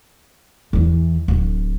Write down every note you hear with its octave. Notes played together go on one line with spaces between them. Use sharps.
E2 E3
D1